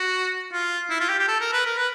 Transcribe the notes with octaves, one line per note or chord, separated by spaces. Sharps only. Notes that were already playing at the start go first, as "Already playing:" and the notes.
Already playing: F#4
F4
E4
F4
G4
G4
A4
A#4
B4
A#4
B4